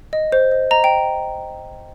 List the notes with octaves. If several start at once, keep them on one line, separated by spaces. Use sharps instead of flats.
D#5
C5
D#5
D#5 A#5
G5